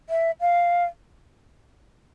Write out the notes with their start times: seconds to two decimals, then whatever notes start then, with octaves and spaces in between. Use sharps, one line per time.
0.09 E5
0.41 F5